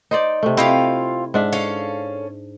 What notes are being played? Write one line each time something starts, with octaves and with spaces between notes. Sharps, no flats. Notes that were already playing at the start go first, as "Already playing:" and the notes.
D#4 C5 D5
C3 A3
C4 E4 F4 G4 D#5 F5
G#2 D4 E5
C#4 A4 F5